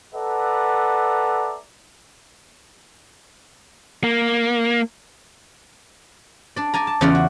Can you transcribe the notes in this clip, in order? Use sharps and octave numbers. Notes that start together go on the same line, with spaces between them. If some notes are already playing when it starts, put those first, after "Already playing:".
A4 B4 D5 E5 F#5 A#5
A#3
D4 D5
D5 G#5 A#5
A5
E2 C#3 C#4 F4 D5 F#5
F#4